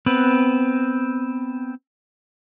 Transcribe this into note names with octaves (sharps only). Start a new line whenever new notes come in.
B3 C4 B4